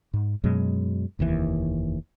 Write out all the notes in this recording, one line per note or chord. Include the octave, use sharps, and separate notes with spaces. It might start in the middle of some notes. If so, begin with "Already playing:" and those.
G#2
F#2 B2 F#3 G#3
F1 D#2 G#2 E3